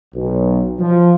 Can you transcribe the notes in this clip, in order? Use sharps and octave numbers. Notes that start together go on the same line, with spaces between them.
B1
F3